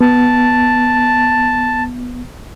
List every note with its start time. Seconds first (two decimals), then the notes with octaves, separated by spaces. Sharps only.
0.01 B3 A5